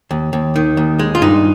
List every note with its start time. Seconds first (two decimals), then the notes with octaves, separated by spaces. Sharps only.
0.11 D#2
0.33 D#2
0.56 D#3
0.77 D#2
0.99 G#3
1.15 F4
1.22 G2 D#4